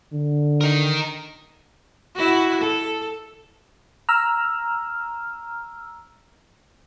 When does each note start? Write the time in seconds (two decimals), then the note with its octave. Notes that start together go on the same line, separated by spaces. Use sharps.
0.12 D3
0.61 D#4 A#4
2.15 E4 F#4
2.61 A4
4.09 A#5 E6 F6